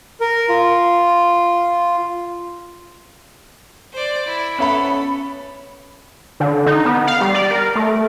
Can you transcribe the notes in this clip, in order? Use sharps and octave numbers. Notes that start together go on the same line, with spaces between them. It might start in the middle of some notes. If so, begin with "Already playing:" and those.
A#4
F4
C5 D5
E4
B3 C#4 A4 E5 B5
D3
D#4
B3
F5
G3
D5
A#4
A3